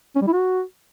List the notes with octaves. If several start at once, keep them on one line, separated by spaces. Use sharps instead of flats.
C#4
G3
E4
F#4